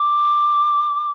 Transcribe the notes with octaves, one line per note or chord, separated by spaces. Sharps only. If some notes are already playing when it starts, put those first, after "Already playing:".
Already playing: D6